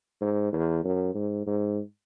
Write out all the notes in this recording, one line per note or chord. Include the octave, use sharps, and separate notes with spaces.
G#2
E2
F#2
G#2
G#2